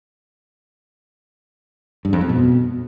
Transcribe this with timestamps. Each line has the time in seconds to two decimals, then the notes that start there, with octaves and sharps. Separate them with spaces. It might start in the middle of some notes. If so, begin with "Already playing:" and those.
2.05 G2
2.13 F2
2.21 G2
2.29 B2